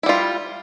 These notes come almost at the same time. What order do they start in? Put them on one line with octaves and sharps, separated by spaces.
E4 G3 F4